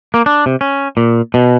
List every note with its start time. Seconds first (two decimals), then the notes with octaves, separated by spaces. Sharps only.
0.14 A#3
0.26 D4
0.46 C3
0.61 C#4
0.97 A#2
1.34 B2